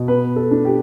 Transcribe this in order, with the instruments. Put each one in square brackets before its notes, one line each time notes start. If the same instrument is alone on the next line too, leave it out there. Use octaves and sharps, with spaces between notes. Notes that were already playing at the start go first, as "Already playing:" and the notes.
Already playing: [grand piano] B2
B3 B4
A4
D4
G4